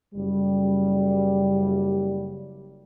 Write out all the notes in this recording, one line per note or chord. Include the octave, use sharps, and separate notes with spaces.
F#1 G3